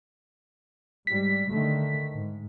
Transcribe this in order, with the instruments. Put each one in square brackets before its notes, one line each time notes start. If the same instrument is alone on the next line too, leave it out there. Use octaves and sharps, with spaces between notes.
[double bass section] G#2 G3 [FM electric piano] B6
[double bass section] D3 D#3 A3
G#2